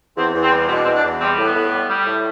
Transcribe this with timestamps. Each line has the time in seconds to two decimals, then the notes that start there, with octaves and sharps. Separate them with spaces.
0.16 E2 C4
0.34 E2
0.43 C4
0.51 G3
0.68 B2 C4
0.75 D4
0.84 E2 C4
0.94 D4
1.04 E2
1.21 G3 C4
1.38 A2
1.45 B3
1.54 A2
1.71 G3
1.88 G3
2.06 A2